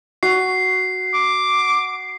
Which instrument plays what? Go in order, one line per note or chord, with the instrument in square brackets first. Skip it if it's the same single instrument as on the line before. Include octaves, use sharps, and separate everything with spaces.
[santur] F#4 [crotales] C7
[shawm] D6